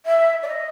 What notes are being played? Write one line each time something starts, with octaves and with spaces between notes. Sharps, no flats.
E5
D5
D#5